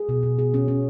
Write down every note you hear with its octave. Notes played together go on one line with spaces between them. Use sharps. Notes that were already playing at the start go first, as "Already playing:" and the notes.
Already playing: G#4
B2
B2
G#4
C#4
C#4